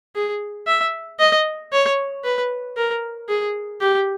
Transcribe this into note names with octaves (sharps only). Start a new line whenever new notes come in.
G#4
E5
D#5
C#5
B4
A#4
G#4
G4